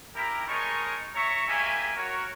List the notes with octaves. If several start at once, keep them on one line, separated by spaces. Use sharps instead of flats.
E4 G4 A#4
G#3 D#4 A#4 C#5 A5 C#6
C#5 E5 A#5 C#6
G#3 A#3 G4 E5 G#5
F#4 A#4 C#5